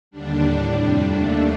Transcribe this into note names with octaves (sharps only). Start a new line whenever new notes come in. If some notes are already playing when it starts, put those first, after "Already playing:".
D#2 D3 G3 D4
A2 G3 D4
F2 C3 G3 D4
D#2 D3 A3